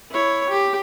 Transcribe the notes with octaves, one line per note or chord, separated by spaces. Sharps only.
E4 C#5
G4